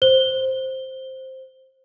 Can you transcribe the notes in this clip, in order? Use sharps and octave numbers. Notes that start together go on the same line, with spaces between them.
C5 G7